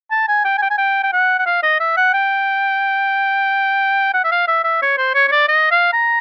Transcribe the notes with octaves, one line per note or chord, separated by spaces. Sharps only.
A5
G#5
G5
G#5
G5
G#5
G5
G5
F#5
F#5
F5
D#5
E5
F#5
G5
F#5
E5
F5
E5
E5
C#5
C5
C#5
C#5
D5
D#5
F5
A#5